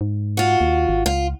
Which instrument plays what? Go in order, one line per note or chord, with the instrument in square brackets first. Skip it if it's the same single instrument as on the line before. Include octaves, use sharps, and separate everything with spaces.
[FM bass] G#2
[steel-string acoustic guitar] F4 F#4
[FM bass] D#2
G#1
[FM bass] C#2 [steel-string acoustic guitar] F4